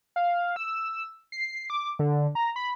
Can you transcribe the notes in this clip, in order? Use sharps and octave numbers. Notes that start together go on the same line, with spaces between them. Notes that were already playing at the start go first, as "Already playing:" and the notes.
F5
E6
C7
D6
D3
A#5
B5